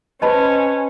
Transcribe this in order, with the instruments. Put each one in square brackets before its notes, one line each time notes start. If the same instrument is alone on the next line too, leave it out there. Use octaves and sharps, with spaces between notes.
[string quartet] C#4 [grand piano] B4 C5 [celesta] D#5 A5 B5